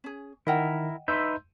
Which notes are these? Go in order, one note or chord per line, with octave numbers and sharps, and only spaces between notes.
C#4 G#4
D#3 E4 A#4 D#5 F#5 G5
D#4 B4 E5 C6 E6 G6